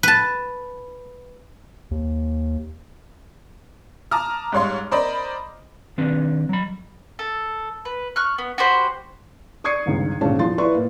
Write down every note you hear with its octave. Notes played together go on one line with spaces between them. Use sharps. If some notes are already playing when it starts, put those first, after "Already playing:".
B4 A5
D#2
A5 A#5 D6 D#6 F6
G#2 G3 C#5 F5 C6
A#4 C5 D5 D#5 B5
D#3 C4 D4 B4
F#3 B5
A4
B4
C#6 F6 F#6
B3
F#4 G4 C5 B5
D5 C#6 D#6 G#6 C7 C#7
G1 C#2 D#3
G#1 D2 A#2 G#3 C#4 A5
E2 F3 C6 A6
E4 B4 D5 E5 C6 C#6
A2 A#3